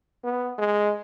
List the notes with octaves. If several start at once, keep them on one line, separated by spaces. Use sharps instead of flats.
B3
G#3